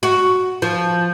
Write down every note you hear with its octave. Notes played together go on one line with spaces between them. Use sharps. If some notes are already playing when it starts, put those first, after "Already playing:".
F#4
F3